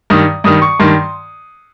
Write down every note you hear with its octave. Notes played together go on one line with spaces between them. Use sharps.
G2 D#3 D#6
G2 D#3 D#6
C#6
G2 D#3 C6